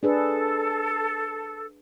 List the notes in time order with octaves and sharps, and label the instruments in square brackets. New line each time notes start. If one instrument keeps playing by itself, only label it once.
[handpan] D4 G#4 B4 [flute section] A4